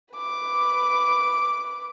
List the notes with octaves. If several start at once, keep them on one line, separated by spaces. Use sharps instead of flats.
B4 D6